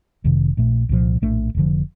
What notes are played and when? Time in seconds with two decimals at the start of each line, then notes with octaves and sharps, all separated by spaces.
0.24 F1 F2 C3 D#3
0.57 A#1 A#2 A3
0.89 C2 A#2 F3
1.22 A#1 A2 A3 D4
1.55 F1 D#2 D3 F3